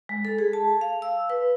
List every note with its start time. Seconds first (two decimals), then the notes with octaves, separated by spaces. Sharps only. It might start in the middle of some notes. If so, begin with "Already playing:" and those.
0.09 G#3
0.25 A4
0.39 G#4
0.53 A5
0.81 F5
1.02 E6
1.30 B4